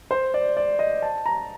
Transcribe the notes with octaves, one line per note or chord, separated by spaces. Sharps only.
C5
D5
D5
D#5
A5
A#5